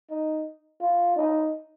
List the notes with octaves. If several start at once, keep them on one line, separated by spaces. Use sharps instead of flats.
D#4
F4
D#4